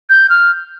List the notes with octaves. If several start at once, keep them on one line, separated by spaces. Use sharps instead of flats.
G6
F6